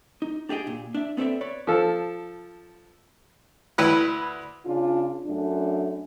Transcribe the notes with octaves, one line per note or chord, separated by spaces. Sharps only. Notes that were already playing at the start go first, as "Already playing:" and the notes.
D#4
D4 G4 G#4 D#5 G5
A#2
D4 E5
B3 C4 A4 C5 D5 E5
B4 C#5 D5
F3 A4
D2 E4 B4 F#6
C#3 D4 F4
F#2 A3 D4